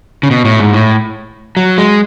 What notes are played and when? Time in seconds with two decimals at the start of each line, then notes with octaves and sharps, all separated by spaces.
0.23 C#3
0.31 B2
0.45 A2
0.60 G#2
0.74 A2
1.57 F#3
1.78 G#3